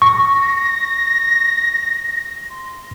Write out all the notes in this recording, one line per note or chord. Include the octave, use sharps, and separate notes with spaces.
C#6 A#6
C6